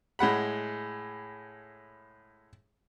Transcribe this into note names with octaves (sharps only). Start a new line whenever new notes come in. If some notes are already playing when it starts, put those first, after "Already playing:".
A2 G#3 F#5 B5